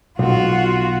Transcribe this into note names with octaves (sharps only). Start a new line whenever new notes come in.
B1 F4 F#4